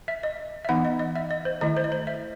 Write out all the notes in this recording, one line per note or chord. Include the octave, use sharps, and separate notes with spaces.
E5
D#5
E5
E3 B3 D#4 F#5
D#5
D#5
E5
D#5
C5
D#3 A3 E4 D#5
C5
D#5
C5
E5